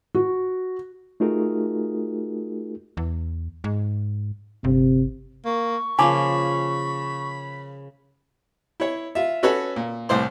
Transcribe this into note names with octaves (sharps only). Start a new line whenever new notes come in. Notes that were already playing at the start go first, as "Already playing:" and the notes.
F#4
A3 D#4 F4 F#4 G#4 A#4
E2
G#2
G1 C3
A#3 C#6
C#3 F3 A#3 G#5 A5 B5 D6
E4 C#5
F4 E5
C#4 F#4 A4 B4 C#5
A#2
C2 A2 C5 C6